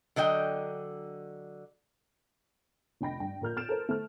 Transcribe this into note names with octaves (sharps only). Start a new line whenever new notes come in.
D3 F#3 D#5 G5
F1 D4 D#5 G5 B5 A#6
G2 G5
A#1 A#4 F6 G6
F6 G6 A6 D7 E7
A4 A#4 C5
A3 F6